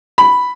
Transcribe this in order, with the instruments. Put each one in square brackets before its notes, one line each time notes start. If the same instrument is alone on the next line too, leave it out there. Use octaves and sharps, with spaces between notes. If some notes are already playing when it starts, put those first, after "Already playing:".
[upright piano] B5